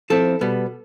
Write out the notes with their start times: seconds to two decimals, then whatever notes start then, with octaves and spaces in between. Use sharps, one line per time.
0.10 F3 C4 E4 A4
0.41 B2 G3 B3